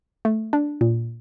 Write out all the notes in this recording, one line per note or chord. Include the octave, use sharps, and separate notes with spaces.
A3
D4
A#2